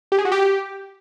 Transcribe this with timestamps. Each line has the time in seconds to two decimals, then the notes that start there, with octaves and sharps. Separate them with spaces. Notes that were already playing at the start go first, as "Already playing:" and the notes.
0.12 G4
0.18 G#4
0.25 F#4
0.32 G4